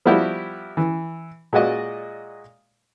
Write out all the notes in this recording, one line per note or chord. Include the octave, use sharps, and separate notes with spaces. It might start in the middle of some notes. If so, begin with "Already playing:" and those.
F3 G3 B3 E4 F#4 G4
E3
A#2 G#3 F#4 D5 D#5